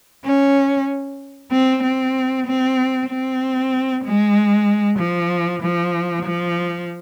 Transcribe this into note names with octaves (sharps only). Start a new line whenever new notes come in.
C#4
C4
C4
C4
C4
G#3
F3
F3
F3